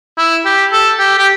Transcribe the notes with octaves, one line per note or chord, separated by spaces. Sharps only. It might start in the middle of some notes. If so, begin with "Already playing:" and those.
E4
G4
A4
G4
G4